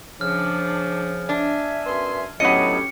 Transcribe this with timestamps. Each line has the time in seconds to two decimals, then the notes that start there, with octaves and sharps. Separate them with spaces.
0.21 C#3 F3 D4 F6
1.29 D4 E5 G#5
1.86 F#2 B3 C6
2.40 D2 A2 F#3 B3 C#4 G4 D#5 C#7